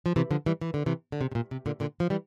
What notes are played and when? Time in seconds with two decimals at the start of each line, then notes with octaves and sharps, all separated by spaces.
0.06 F3
0.16 C3 E3
0.31 D3 F3
0.46 E3 G3
0.61 E3
0.74 D3
0.86 C3 E3
1.12 D3
1.21 C3
1.32 C3
1.35 A#2
1.51 C3
1.66 A#2 D3
1.80 A#2 D3
2.00 F3
2.10 E3 G3